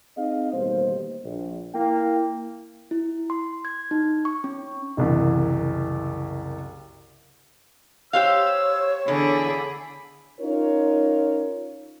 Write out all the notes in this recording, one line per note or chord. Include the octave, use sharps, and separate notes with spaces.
C4 D#4 G#4 D#5 F5
A1 D#2 B2 G3 A#3 C5
A#1
A#3 E4 G5
E4
C6
G#6
D#4
C#6
C#4
F#1 C2 E3
G4 C5 C#5 F5 E6
E2 D3 G#4 B5
C#4 D#4 F4 A#4 C#5